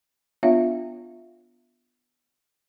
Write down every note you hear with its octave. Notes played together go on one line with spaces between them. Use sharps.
B3 D4 F4 C#5 E5 F5